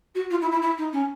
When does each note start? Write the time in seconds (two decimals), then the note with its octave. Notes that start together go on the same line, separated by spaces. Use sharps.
0.15 F#4
0.30 F4
0.41 E4
0.51 E4
0.61 E4
0.77 D#4
0.92 C#4